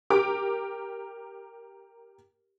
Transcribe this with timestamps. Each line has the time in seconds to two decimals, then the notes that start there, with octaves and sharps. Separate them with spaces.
0.10 G4 A#4 D6